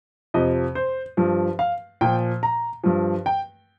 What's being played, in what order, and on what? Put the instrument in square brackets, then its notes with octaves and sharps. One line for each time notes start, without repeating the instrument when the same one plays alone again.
[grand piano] F2 C3 F3 D#5
C5
G2 F3
F5
A#2 F3 G5
A#5
G2 F3
G5